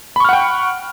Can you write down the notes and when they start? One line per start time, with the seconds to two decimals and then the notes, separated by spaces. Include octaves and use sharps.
0.16 B5
0.20 C#6
0.25 F6
0.29 F#5
0.33 G5